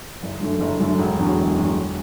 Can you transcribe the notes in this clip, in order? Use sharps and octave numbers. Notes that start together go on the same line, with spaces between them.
F#1
F#2 D3 A3
F#1
F#2 D3 A3
E1
E2 D3 F#3
E1
E2 D3 F#3
E1